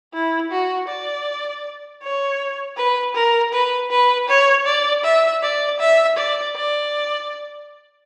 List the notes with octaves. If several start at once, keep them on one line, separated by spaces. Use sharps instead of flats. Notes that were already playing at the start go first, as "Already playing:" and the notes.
E4
F#4
D5
C#5
B4
A#4
B4
B4
C#5
D5
E5
D5
E5
D5
D5